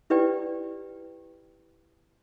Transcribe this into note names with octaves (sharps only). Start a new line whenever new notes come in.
E4 G4 B4 D5 G5